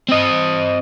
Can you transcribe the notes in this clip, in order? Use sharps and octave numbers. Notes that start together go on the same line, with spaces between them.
C4 D#5